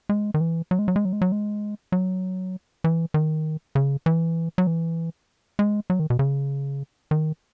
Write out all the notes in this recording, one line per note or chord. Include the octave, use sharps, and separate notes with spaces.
G#3
D#3
E3
F#3
G#3
F#3
G#3
F#3
G#3
F#3
G#3
F#3
E3
D#3
C#3
E3
F#3
E3
G#3
F#3
D#3
B2
C#3
D#3